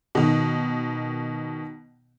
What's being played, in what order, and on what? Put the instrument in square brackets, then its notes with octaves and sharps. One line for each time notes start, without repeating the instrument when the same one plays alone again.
[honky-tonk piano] B2 D#3